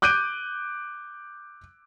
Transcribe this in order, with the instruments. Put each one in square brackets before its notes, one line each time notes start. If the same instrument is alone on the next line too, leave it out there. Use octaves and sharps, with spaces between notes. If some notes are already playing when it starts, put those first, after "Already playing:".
[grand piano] D6 F#6 G6 D7 D#7